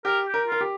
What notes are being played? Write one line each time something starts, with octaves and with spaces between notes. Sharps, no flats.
G4 A#4
G4
A#4
F4
A#4
G4